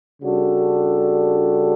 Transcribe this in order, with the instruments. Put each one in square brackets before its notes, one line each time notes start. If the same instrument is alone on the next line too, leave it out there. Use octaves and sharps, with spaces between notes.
[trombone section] C#3 G3 D4 F#4 A4